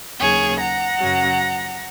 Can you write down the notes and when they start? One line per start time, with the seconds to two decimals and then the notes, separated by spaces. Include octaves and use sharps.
0.19 D#2 C#3 F#3 A#3 G#4 C#5
0.59 F#5 A#5
0.98 F#2 C#3 F#3